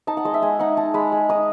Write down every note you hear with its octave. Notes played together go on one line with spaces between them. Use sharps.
D#4 A5
F#5
G#3 D#5
E5
G#3 G#5
D#4 F#5
D#4 A5
G#3 B5
G#3
D#4 D#6